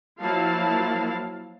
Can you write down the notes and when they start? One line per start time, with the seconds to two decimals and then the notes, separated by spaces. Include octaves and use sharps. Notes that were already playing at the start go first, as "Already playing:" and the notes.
0.21 F3 F#3 A#3 E4 F5 A5